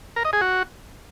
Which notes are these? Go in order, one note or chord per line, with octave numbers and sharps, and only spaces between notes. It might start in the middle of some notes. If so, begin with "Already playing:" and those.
A#4
D#5
G#4
F#4